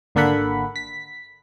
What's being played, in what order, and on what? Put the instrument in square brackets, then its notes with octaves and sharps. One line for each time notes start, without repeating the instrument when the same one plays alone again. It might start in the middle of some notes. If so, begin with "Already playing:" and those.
[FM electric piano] G#1 D3 A#3 A4 F#5 B5
B6